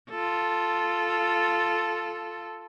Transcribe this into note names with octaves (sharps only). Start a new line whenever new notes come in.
F4 A4